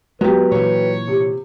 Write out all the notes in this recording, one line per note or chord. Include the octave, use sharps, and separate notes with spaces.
F#3 G#3 B3 G4 B4
A#2 E3 C#5
C3